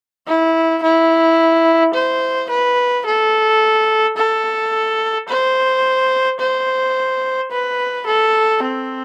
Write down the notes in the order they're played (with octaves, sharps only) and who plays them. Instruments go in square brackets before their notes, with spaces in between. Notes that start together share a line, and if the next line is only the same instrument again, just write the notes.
[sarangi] E4
E4
C5
B4
A4
A4
C5
C5
B4
A4
C4